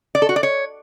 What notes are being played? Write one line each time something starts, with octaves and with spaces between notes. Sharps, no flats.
D5
A4
F#4
D5
C#5